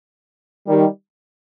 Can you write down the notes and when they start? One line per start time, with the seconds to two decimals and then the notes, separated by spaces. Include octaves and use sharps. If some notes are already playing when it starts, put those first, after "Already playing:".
0.68 D#3 G3